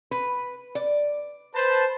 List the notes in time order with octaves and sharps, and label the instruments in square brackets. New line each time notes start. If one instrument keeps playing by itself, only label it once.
[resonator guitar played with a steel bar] B4
D5
[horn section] B4 C5 A5